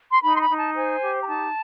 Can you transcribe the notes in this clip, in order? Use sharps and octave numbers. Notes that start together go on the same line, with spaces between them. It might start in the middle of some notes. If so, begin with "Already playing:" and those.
C6
D#4 B5
C6
B5
D#4
A5
C5 G#5
G4
A#5
D#4 A5